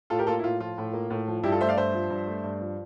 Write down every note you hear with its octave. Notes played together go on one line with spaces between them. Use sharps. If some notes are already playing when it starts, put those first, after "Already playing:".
A2 F4 A4
G4 A#4
A#3 F4 A4
E4
A2 F4
F3 F4
A2
A#3
A2
F3
G2 E4 G4
F4 A4
A3 C5 E5
D5 F5
G2 C5 E5
F3
G2
A3
G2
F3